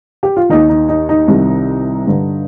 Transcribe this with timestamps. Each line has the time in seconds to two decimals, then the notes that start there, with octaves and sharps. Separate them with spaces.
0.23 G4
0.36 F4
0.49 D#2 D#3 D#4
0.69 D#4
0.89 D#4
1.09 D#4
1.28 C2 C3 D#3
2.07 G2 D3